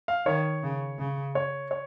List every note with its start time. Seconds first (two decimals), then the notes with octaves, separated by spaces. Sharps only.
0.08 F5
0.26 D#3 C#5
0.63 C#3
0.99 C#3
1.35 C#5
1.71 C#5